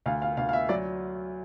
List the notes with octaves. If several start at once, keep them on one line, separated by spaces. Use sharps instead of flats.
D2 F5
F5
D2 F5
F5
E5
F#3 D5